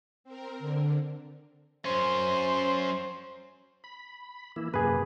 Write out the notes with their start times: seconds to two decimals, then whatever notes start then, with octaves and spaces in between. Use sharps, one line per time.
0.24 C4 A#4
0.59 D3
1.85 F#2 C#4 C5
3.84 B5
4.56 E3 A#3 E4
4.74 F#2 C3 A#3 G#4 B4